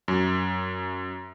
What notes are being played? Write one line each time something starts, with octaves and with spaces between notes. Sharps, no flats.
F#2